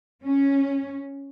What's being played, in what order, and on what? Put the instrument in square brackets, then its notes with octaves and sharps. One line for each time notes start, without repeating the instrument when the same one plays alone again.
[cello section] C#4